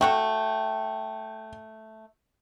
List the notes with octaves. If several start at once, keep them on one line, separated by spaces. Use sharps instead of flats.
A3 F#4 A4 G5